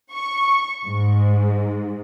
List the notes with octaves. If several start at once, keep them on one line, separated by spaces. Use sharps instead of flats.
C#6
G#2